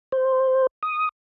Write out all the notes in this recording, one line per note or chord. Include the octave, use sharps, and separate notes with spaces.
C5
D#6